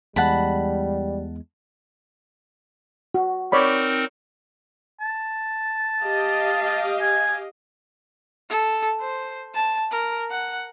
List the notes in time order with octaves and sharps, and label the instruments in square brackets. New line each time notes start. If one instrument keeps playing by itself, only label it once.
[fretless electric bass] E2 G#3 [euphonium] G3 [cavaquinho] F#5 A5 B5
[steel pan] F#4
[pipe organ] C4 D#4 A#4 [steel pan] C#5 D5 B5
[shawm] A5
[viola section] G4 D#5 F5
[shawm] G#5
[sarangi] A4
C5
A5
A#4
F#5